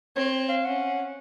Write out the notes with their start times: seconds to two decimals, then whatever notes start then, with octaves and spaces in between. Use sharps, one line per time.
0.16 C4 C#5
0.49 F5
0.65 C#4 F#5